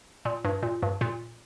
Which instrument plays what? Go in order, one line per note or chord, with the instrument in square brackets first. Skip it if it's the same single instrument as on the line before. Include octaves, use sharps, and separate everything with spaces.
[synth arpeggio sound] A#2
G2
A#2
G2
A#2